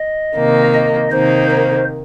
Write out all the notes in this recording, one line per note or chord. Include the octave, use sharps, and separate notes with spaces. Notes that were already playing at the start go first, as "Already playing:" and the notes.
Already playing: D#5
C3 D#3 A#3
D#5
C3 D#3 A#3 D#4 C5
C5